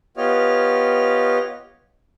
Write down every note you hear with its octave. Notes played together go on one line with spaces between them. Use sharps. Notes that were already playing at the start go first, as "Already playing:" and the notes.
B3 F4 G4 C#5 D#5 F6